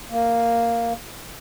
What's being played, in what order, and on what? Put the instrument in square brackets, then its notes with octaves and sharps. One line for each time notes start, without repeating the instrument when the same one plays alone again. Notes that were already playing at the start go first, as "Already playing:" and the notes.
[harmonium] A#3